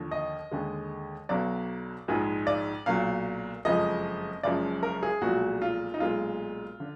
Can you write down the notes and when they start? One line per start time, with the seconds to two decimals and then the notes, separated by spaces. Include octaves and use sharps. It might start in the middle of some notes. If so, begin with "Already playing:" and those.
Already playing: D#2 D3 F3
0.11 D#5
0.51 D#2 D3 G#3
1.29 B1 B2 F#3 D5
2.08 A#1 G#2 F3 G#3
2.47 D5
2.86 B1 A#2 F#3 F5
3.65 F#1 F2 F3 G#3 D#5
4.43 F#1 F#2 F3 G#3 D5
4.83 A#4
5.03 G#4
5.22 B1 A#2 F3 G#3 F#4
5.62 F4
5.94 D#4
6.00 B1 A#2 G#3 F4
6.80 D3